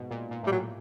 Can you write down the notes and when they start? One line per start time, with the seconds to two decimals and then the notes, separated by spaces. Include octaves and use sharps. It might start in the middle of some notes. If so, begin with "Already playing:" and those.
Already playing: G#2 B2
0.11 A#2
0.31 A#2
0.43 A2
0.47 G3
0.52 A#2 F#3